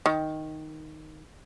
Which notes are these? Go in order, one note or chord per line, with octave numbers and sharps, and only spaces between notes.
D#3